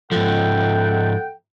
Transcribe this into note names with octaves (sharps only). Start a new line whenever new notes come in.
G#2 F3 A4 F#5 G5